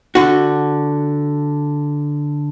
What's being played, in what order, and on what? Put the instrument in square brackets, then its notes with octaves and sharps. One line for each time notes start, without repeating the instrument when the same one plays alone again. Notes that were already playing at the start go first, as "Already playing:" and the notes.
[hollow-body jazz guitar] D3 F#4